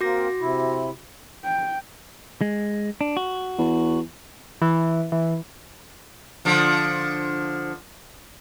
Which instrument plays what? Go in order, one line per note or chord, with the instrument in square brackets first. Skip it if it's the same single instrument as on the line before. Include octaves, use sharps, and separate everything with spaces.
[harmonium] A#3 C4 A#4 [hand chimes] F#4 D6 A#6
[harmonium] C3 E4
[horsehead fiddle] G5
[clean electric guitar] G#3
D4
F#4
[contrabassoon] E2
[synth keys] E3
E3
[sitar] D3 F3